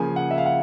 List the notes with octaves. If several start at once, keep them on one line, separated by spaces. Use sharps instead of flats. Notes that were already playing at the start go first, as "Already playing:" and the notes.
Already playing: C#3 F3 A#3 G#5
F#5
E5
F5
F#5